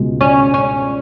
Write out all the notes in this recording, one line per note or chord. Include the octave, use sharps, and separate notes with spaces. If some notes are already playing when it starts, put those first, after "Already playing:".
Already playing: C#2 B2 G#3
C#4
C#4